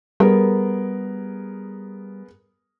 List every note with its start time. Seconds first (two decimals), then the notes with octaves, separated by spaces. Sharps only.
0.20 G3 B3 G#4 A#4